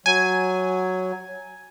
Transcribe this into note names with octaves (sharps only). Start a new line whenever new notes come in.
F#3 G#5